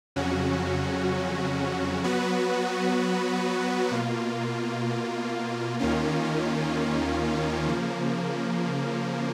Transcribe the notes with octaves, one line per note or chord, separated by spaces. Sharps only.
F2 C#3 F#3 C#4 F#4
F#3 B3 F#4 B4
B2 A#3 F4
D#2 D#3 A#3 C#4 F4
C#3 F3 A#3